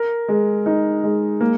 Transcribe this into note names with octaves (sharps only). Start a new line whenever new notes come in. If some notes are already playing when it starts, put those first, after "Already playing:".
Already playing: A#4
G#3
D#4
G#3
A#3